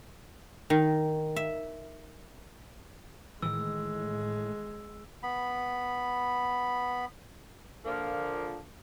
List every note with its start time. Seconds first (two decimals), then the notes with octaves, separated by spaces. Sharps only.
0.70 D#3
1.36 E5
3.42 A2 D#3 E3 G#3 E6
5.23 B3 B5
7.85 A#2 D3 F3 A#3